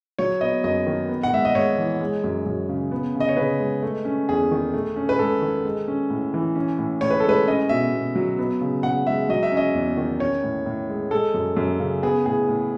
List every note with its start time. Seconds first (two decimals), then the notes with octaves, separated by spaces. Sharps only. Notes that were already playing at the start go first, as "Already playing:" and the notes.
0.19 F#3 C#5
0.41 B3 D#5
0.64 F#2 D#5
0.87 D#3
1.09 B3
1.23 F#5
1.33 G#2 E5
1.45 D#5
1.54 G#2 C#5
1.78 E3
2.01 G#3
2.24 F#2
2.46 F#2
2.69 C#3
2.91 B3
3.15 C#3
3.20 D#5
3.29 C#5
3.37 C#3 B4
3.60 G#3
3.82 A3
4.05 C#4
4.29 E2 G#4
4.52 D#3
4.74 A3
4.96 C#4
5.09 B4
5.19 G#2 A4
5.42 D#3
5.65 G#3
5.88 C#4
6.10 A2
6.34 E3
6.55 C#4
6.79 A2
7.01 A2 C#5
7.11 B4
7.20 A4
7.24 G#3 B4
7.47 C#4 D#5
7.69 B2 E5
7.93 B2
8.15 F#3
8.39 B3
8.61 C#3
8.83 C#3 F#5
9.07 G#3 E5
9.29 F#3 D#5
9.43 E5
9.52 C#4
9.57 D#5
9.74 E2
9.97 D#3
10.20 C#4 C#5
10.43 A2
10.66 A2
10.89 G#3
11.11 G#3 A4
11.34 F#2
11.57 F#2
11.80 C#3
12.03 B3 G#4
12.26 A2 G#4
12.49 A2